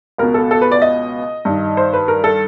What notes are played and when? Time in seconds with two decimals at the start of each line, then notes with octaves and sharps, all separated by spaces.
0.18 C#2 B2 A#4
0.34 A4
0.51 A4
0.61 B4
0.72 D5
0.82 D#5
1.45 G2 D#3
1.77 C5
1.93 B4
2.08 A#4
2.24 A4